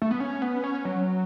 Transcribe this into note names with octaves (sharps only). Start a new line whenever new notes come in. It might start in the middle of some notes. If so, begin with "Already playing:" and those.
A3
B3
C#4
B3
C#4
F#3